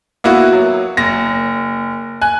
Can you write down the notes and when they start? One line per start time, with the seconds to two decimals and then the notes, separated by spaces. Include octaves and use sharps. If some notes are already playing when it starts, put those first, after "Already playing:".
0.24 A#3 B3 E4 F#4
0.53 F#3
0.97 F#1 A#6
2.22 G#5 F#6